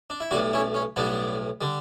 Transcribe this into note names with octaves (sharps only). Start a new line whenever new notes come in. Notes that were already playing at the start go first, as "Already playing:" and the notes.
D4
E4
B1 A2 G3 D4 F#4
C#4 E4
C#4
B1 A2 G3 B3 D4
D3 G3